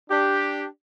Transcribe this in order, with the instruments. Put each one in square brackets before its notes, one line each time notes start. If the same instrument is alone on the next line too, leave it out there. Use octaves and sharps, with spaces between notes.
[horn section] D4 G4